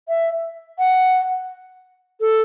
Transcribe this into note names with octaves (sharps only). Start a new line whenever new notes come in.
E5
F#5
A4